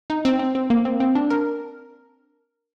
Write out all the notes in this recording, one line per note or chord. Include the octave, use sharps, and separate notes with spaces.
D#4
C4
C4
C4
A#3
C4
C4
D4
A#4